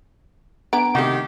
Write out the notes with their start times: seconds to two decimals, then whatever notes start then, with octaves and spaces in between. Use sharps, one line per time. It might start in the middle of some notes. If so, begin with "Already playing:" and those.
0.73 B3 D4 A#5 D6 D7
0.95 C3 D#3 A3 F#4 G4